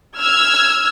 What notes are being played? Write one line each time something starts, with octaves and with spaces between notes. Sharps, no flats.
E6 F6 G#6